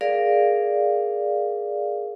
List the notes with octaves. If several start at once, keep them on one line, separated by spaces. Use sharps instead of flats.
G#4 A#4 D5 F5